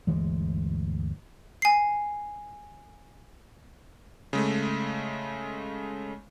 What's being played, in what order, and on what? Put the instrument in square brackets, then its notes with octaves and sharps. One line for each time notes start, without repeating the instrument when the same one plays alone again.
[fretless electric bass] G1 D2 E3 G#3
[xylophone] G#5 C7
[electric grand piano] C#3 G#3 A3